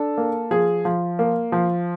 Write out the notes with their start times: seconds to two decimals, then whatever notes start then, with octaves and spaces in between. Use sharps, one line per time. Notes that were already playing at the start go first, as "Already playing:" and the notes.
Already playing: D4 A4
0.18 A#3
0.51 F3 G#4
0.85 F3
1.19 A#3
1.52 F3